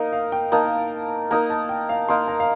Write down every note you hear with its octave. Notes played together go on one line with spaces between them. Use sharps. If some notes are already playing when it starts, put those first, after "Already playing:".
Already playing: A#3 D#4 A#4 D#5 F5
F5
G5
A#3 D#4 A#4 A5
A#3 D#4 A#4 A#5
A5
G5
F5
A#3 D#4 A#4 C6
A#5
F5